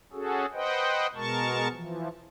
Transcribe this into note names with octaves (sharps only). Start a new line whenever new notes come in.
C#4 F#4 G#4 A4
B4 C5 D#5 F#5 G5
B2 G#3 A#4 A5 C#6
E3 F3